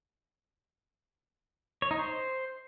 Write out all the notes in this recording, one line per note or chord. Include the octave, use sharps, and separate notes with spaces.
C#5
D#4
C5